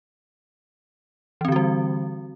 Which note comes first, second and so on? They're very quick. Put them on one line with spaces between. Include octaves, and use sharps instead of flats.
E3 C4 D3 F#4 G3